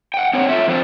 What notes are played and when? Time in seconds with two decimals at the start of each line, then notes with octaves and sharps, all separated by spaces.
0.14 F#5 G5
0.33 C4 D4 C#5 F#5
0.49 A3 F4 E5
0.68 F3 A3 C4 D4